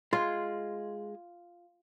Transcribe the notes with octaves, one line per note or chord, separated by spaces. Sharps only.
G#3 F4